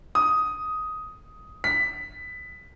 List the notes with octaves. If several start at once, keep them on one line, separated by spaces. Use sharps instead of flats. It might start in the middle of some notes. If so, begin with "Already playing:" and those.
D#6
B6